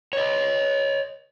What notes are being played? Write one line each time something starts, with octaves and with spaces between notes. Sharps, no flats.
C#5 D#5